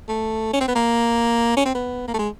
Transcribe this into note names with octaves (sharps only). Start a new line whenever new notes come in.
A3
C#4
C4
B3
A#3
C#4
C4
B3
A#3
A3
G#3